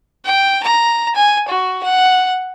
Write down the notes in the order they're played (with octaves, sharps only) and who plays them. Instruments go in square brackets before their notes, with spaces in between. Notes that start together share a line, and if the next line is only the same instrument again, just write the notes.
[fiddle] G5
A#5
G#5
F#4
F#5